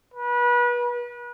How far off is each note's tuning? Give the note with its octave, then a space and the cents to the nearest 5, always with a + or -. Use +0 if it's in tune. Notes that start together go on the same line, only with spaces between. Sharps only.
B4 -30